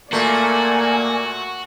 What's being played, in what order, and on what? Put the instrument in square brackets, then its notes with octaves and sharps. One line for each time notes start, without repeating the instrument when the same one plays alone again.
[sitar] A#2 A3 [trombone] A#3 [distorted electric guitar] F#4 [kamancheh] D5 G#5